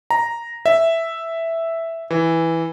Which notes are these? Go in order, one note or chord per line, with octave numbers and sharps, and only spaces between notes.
A#5
E5
E3